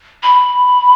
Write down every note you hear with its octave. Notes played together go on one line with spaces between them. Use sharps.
B5